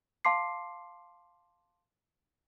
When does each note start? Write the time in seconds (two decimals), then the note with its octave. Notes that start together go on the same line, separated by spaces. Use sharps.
0.25 F5 A5 C6 D6 C7